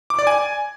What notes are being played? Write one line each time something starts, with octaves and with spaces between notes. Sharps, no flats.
D6
D5
G#5